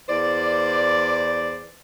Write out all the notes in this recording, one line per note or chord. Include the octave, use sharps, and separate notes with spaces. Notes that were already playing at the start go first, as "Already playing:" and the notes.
E2 C5 D5